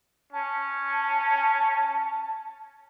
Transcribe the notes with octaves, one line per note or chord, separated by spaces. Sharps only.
C#4 A5